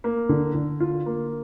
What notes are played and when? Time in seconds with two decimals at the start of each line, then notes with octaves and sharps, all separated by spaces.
0.04 A#3
0.29 D3
0.55 D3
0.80 F4
1.06 A#3